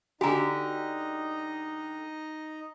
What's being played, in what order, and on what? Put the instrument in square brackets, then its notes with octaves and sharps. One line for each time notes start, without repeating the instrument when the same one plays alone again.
[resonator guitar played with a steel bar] D3 G4 [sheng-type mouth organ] D#4 D#5 [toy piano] F#4 G#5 A#5